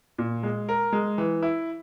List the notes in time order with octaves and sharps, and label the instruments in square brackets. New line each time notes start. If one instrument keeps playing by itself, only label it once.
[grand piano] A#2
G#3
A#4
G#3
E3
E4